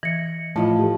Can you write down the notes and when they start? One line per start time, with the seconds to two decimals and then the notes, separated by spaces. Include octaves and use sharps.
0.03 E3 D#5 A#6 C#7
0.56 A2 F3 E4 D#5 A5
0.79 G4 A4